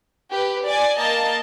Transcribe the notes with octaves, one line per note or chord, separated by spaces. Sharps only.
G4 B4
D5 G#5
A#3 D#5 A5